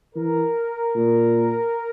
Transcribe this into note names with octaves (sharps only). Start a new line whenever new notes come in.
E3 A#4
A#2